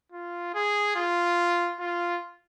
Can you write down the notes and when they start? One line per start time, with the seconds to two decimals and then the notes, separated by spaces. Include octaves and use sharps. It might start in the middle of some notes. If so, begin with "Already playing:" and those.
0.12 F4
0.54 G#4
0.96 F4
1.80 F4